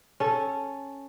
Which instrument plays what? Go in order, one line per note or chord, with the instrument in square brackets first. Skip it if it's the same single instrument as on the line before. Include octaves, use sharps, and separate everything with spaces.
[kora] C#4 A4